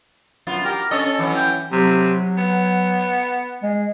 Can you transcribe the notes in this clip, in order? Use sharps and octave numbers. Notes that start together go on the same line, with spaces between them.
F#2 B3 F4
G4 A#4
C#4 A4 C#5 D#5
E3 F#3 C#4
G5
C3 F#3
B3
G#3